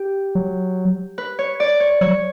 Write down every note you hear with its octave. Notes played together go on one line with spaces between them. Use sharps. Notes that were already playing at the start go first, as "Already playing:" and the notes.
Already playing: G4
F#3
B4
C#5
D5
C#5
F#3 C#5